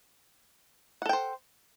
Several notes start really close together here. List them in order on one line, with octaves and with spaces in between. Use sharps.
F#5 A4 G5 C5